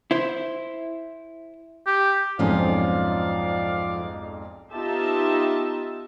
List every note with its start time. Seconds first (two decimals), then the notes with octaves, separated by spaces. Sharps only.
0.11 E4 C5
1.87 G4
2.39 B1 F2 G#2 F3 C#4 D5 F5
4.74 B3 D#4 F4 G4 E5 A5